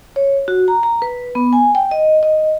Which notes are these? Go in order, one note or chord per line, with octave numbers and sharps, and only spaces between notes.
C#5
F#4
A#5
A#5
B4
B3
G#5
G5
D#5
D#5